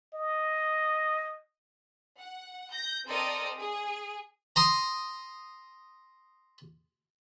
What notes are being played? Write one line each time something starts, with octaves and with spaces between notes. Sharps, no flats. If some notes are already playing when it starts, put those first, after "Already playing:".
D#5
F#5
G6 A#6
C4 A4 A#4 C5 D5 D#5
G#4
A#5 C6 D#6